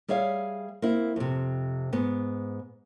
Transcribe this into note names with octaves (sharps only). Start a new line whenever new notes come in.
G3 G#4 C#5 E5 F5
A#3 C4 E4
F2 C3
G#2 B3